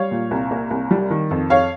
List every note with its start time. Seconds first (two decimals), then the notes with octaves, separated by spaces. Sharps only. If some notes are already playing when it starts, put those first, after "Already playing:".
Already playing: G3 C#5 F5
0.11 A#2
0.31 C2
0.51 A#3
0.71 C2
0.91 G3
1.10 D#3
1.31 F2
1.50 F2 C#5 F5